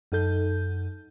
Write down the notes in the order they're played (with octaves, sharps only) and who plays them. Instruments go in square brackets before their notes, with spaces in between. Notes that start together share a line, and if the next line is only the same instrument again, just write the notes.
[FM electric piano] F#2 D#4 A4 G6